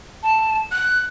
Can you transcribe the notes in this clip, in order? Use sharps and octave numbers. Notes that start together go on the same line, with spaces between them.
A5
F#6